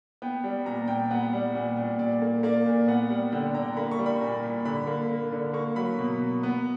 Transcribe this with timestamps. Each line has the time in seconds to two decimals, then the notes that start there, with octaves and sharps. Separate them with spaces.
0.22 B3 G5
0.44 G3
0.65 A#2 A#5
0.88 A#2 G5
1.10 B3 F#5
1.33 G3
1.55 A#2
1.77 A#2
1.99 A#2 D5
2.22 A#3
2.43 A#3 D5
2.66 A#2
2.88 B3 F#5
3.10 G3
3.32 D3 G5
3.54 D3 A#5
3.77 A#3 B5
3.91 C#6
3.99 G3
4.06 B5
4.21 A#2 A#5
4.43 A#2
4.65 D3 B5
4.87 A#3
5.10 A#3
5.32 D3
5.54 A#3 C#6
5.76 F#3 B5
5.99 B2
6.21 B2
6.43 B3